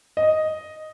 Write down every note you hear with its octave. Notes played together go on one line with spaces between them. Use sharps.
D#5